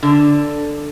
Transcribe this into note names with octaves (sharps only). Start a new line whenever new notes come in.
D3